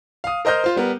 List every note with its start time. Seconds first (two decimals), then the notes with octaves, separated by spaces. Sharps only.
0.24 F5 D#6
0.45 A#4 C5 D#5 F6 G6
0.64 F4 C5
0.76 G3 B3 A#4